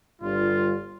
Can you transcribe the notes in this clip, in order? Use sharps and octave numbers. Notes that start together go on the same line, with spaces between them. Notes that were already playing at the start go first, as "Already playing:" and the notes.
G1 G3 F4